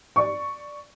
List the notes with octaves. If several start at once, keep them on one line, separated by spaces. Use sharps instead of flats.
D5 C#6